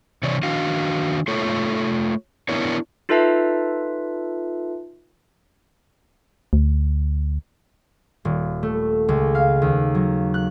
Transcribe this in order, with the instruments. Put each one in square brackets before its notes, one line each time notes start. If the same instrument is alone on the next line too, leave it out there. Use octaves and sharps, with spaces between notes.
[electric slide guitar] C3 E3 C#5 D5
D#3 D4 F#4 F5
A3 F4 A4 C#5
B3 D4 E4 A#4 C#5
[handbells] D#4 F4 A4 B4 E5 A5
[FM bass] D2
[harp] D#1
A3
C#2
F5
D#2
F#3
F#6